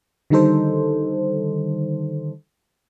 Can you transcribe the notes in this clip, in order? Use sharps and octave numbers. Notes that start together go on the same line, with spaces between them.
D3 D#3 G3 D#4 A4 C5